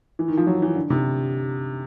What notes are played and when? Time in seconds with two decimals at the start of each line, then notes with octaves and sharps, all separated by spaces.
0.19 E3
0.28 D#3
0.37 F3
0.47 F#3
0.62 E3
0.76 D3
0.90 C3